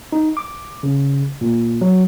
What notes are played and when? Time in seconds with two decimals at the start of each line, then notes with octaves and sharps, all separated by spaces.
0.12 D#4
0.37 D6
0.83 C#3
1.41 A#2
1.81 F#3